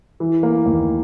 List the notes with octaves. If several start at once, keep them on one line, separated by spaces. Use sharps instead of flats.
E3
A#3
D#2